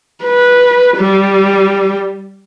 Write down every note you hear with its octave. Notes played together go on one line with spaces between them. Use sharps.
B4
G3